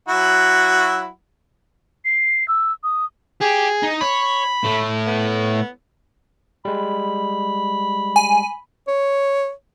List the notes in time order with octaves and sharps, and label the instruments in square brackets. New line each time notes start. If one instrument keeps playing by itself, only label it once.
[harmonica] F#3 E4 F#4
[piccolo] C7
E6
D#6
[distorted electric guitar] G4 [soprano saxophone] G#4
[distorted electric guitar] D#4
[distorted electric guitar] C#5 [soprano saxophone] B5
[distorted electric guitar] A2 A3
[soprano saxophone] B3
[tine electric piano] G3 G#3 [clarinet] B5
[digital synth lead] G#5
[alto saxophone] C#5